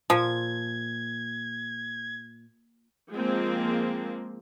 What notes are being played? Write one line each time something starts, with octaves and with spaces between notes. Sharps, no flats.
A#2 F3 G#6
F3 G#3 A#3 C4